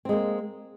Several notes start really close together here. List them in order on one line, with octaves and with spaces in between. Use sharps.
C4 G#3 A#3